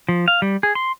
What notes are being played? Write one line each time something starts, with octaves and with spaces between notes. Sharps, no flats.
F3
F5
G3
G#4
C6